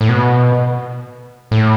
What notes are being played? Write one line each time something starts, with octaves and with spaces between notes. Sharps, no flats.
A2
B2
A2